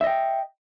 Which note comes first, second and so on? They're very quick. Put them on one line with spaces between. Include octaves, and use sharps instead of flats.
E5 D#5 G5